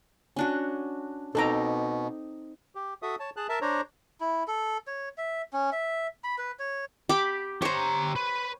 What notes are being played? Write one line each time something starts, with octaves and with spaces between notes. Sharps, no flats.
C#4 D4 F#4
B2 C4 D#4 A4 A#5 D6
G4
F#4 A4 E5 D#6
C#5 A5
G#4 A5 F#6
A#4 E5 A5
D4 C5 C#5 A#5
E4
A4
C#5
E5
C#4
E5
B5
B4
C#5
G4 B5 D6
G4 C5 C#5 A#5
B4